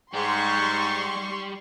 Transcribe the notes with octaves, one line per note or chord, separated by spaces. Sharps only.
G#2 G3 G4 C6 C#6